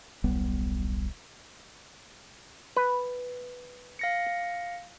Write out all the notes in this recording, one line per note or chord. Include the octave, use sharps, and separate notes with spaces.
D#1 B1 G3 B3
B4
F5 A#6 C#7